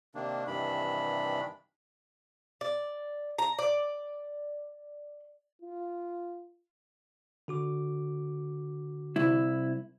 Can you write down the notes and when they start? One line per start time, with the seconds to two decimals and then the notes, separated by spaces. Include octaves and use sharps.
0.15 C3 D#3 A#3 D4
0.47 G2 C3 D#3 E3 D4 B5
2.61 D5
3.39 A#5
3.58 D5
5.62 F4
7.48 D3 F#4 D6
9.16 C2 E4